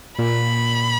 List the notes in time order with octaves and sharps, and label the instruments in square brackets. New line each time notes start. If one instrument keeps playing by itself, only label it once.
[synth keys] A#2 [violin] B5